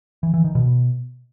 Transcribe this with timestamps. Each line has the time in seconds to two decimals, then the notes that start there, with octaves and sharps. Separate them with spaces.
0.23 E3
0.34 E3
0.44 D#3
0.55 B2